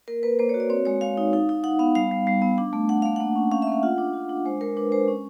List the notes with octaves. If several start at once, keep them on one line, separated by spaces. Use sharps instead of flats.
A#3 A#4
A#3 B4
A#3 C5
C#5
F#4
D5
C4 C#5
G#3 C#5
G#3 F5
D#4
D#4
D#4
D#4 F#5
B3 F5
G3 F5
G3
G3
B3
D4
A3
D4 F#5
A3 F5
A#3 F#5
C#4
C#4 F5
E5
A#3 F5
F4 F#5
D4
F4
D4
G#3 C5
G#3 A#4
D4 B4
G#3 C5
C#4